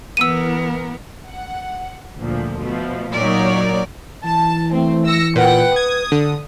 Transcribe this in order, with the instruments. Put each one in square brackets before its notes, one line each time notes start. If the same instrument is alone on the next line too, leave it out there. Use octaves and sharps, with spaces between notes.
[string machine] E3 A#4 [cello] B3 [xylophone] E6 D#7
[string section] F#5
D2 A#2 F3
[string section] B2 F3 [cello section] A3
[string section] A#2 D#4 C#5 [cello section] F#3 A#4 D5
[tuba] E3 [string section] A5
[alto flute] A3 [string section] C4
[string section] E6 A#6 C#7
[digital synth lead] A#2 [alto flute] B4 [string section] F#5 G5
[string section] D#6 [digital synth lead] G#6
[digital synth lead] D3